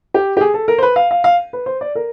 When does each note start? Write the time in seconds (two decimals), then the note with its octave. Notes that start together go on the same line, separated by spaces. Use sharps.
0.14 G4
0.37 G4
0.41 G#4
0.54 A4
0.68 A#4
0.78 C5
0.82 B4
0.96 F5
1.11 F5
1.24 F5
1.53 B4
1.66 C5
1.81 D5
1.95 A#4